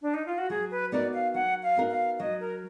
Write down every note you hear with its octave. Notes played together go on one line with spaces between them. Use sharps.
D4
D#4
F4
F#4
F#3 G#4
B4
B3 D#4 F#4 A#4 D5
F5
F#3 F#5
F5
B3 D#4 F#4 A#4
F5
F#3 D#5
A#4